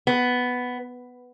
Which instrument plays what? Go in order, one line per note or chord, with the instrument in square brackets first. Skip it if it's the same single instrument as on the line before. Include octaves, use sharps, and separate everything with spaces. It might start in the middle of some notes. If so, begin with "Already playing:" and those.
[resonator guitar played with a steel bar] B3